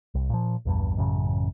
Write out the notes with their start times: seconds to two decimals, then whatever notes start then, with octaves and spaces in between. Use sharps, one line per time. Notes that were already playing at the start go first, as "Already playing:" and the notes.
0.14 C2
0.30 A#2 F3
0.65 A#1 E2 G2
0.97 A1 F#2 C#3